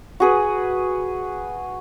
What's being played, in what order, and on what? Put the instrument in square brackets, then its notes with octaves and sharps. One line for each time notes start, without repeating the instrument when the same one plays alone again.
[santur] F#4 G#4 B4